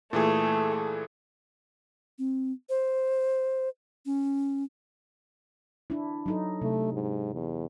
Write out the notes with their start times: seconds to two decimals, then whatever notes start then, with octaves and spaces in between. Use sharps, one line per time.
0.13 A#2 E3 A3 G#4
2.18 C4
2.69 C5
4.06 C#4
5.90 D4 E4
6.26 F#3 D#4 A4
6.61 C3 A3
6.92 G#2
7.34 E2